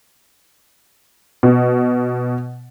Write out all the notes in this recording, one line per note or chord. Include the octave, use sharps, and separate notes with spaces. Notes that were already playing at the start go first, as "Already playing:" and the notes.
B2